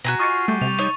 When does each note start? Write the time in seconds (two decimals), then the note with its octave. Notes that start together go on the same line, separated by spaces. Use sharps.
0.04 B2 F#4 G#4 A#5
0.19 F4 D#5 G#5 C#6 D6 A6 C#7
0.48 G3 A3
0.61 C3 F7
0.79 D#4 C#5